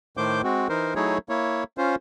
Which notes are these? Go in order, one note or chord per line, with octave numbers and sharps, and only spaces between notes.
A2 D#3 A3 C5 D6 G6
G#3 C4 F#4
E3 D#4 A#4 C5
F#3 A3 D#4 E4 G#4 C#5
A#3 E4 C#5
C#4 F4 C5